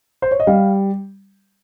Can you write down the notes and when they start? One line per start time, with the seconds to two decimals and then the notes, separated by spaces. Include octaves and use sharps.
0.22 C5
0.31 C#5
0.40 D#5
0.47 G3 F5